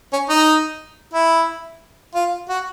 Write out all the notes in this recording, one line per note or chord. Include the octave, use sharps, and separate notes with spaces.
C#4
D#4
E4
F4
F#4